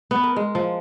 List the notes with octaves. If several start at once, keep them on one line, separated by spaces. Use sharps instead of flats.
B3
A#4
G#3
F3